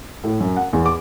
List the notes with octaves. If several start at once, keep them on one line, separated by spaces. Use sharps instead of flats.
A2
F#2
F#5
E2
D6